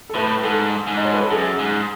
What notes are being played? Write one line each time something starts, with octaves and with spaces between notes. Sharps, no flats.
A4
A2 B4
G#2 A4
G#2
D#5
C#5
B4
A4
F#2 G#4
G#2